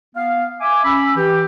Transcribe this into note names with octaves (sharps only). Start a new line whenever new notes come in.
B3 F5
E5 G#5 D6
C#4 B5 E6
E3 G4